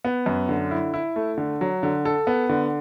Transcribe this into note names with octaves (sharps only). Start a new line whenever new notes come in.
B3
F#2
D3
E4
E4
A3
D3
F#3
D3
A4
B3
D3